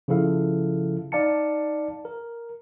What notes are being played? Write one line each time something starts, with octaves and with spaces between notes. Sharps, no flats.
C#3 F3 E4 A4 F5
D#4 D5 F5 A5 C#7
A#4